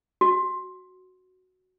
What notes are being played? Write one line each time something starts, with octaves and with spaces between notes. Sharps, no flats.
F#4